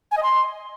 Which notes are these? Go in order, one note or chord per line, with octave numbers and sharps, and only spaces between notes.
G#5
D#5
C6